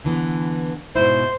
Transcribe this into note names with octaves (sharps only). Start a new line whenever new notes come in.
D3 E3 B3
G#2 B2 E4 C5